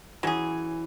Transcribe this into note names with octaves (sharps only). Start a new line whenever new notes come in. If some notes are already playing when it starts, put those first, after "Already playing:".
E3 F#3 C#4 G#4